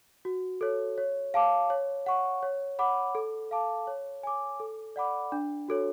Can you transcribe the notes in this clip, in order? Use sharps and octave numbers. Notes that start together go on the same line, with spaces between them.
F#4
A4 C#5
C#5
F5 A5 D6
C#5
F#5 C#6
C#5
F#5 B5 D6
A4
F5 A5 D6
C#5
G#5 D6
A4
D5 F#5 B5 D6
D4
F#4 A4 C#5